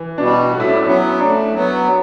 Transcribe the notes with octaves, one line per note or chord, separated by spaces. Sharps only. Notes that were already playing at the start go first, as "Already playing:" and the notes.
Already playing: E3
B2 G3 D4
A2 F#4
E4
D4
E4
F#3 B3 C#4
A2 D4
F#3 B3